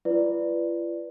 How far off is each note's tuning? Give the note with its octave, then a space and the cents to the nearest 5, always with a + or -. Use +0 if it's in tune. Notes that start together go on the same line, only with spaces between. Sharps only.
F4 -45 B4 +0 D5 +0